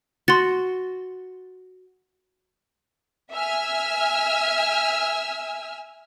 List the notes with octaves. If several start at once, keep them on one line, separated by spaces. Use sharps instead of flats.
F#4 C6 A6
E5 G#5 E6 F6